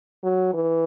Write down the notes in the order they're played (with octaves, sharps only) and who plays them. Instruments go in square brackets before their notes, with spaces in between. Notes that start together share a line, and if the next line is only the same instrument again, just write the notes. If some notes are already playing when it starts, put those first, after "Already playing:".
[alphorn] F#3
E3